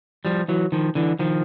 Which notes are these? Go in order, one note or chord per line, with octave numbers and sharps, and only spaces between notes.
F3 G3
E3 F#3
D#3 F3
D3 E3
D#3 F3